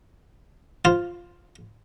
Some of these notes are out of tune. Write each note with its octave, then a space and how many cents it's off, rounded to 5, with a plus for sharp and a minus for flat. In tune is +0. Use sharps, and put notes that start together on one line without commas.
F4 +0 C5 +0